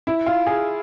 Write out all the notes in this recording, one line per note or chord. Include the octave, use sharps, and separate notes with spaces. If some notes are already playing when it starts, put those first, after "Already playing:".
E4
F4
G#4